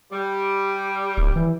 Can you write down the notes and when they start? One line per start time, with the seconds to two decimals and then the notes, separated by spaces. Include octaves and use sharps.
0.12 G3
1.17 D1
1.36 E3